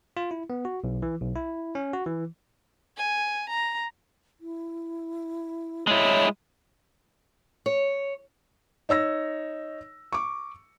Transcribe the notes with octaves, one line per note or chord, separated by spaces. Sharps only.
F4
E4
B3
F#4
B1
E3
B1
E4
C#4
F#4
E3
G#5
A#5
E4
G#3 E4 C#5
C#5
D#4 C#5 E6 A#6
C#6 D6